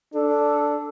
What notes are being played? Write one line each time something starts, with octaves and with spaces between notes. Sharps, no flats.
D4 A4